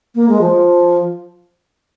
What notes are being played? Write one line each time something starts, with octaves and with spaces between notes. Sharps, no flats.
A#3
G#3
F3